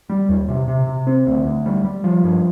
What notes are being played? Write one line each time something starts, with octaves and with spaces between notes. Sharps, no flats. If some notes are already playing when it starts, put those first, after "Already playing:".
G3
D#2
C3
C3
C3
C4
D2
D2
G3
G3
F3
G2